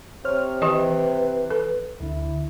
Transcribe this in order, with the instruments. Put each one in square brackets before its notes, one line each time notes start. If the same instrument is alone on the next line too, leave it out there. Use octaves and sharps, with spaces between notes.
[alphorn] C3 [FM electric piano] C5 C#5 F6
[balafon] D#3 G4 D#5 [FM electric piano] E3 [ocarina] B4
[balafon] A4
[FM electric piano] D2 D3 [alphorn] E4